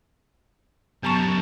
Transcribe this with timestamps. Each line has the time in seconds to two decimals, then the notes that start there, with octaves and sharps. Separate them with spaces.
1.03 F#2 G3 B3 A5 A#5 C#6